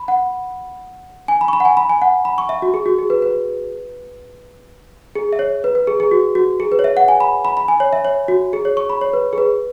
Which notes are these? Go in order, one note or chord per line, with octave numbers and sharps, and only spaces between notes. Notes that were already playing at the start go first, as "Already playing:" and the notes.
Already playing: B5
F#5
G#5
B5
C#6
B5
F#5
G#5
B5
G#5
F#5
B5
C#6
E5
F#4
G#4
F#4
G#4
B4
B4
G#4
E5
C#5
B4
B4
G#4
G#4
F#4
F#4
G#4
B4
C#5
E5
F#5
G#5
B5
B5
B5
G#5
C#5
E5
C#5
F#4
G#4
C#5
C#6
B5
C#5
B4
G#4
B4